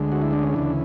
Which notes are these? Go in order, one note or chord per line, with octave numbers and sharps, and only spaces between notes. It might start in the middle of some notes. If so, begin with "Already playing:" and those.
Already playing: D2 D3 G#3
F#4
E4
D4
C#4
D2 C#3 E3 D4